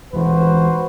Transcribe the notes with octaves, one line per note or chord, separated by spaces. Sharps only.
D2 E3 G#3 F#4 B4 C5